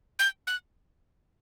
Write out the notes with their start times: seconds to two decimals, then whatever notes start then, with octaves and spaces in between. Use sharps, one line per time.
0.19 G6
0.47 F#6